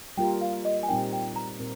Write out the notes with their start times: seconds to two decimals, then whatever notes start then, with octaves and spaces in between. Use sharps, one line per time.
0.17 G3 A#3 F4 A#4 G5
0.41 F5
0.65 D#5
0.83 G#5
0.88 A#2 G3 C4 D#4 A#4 G5
1.13 G5
1.36 A#5
1.60 A#2 C4 A#4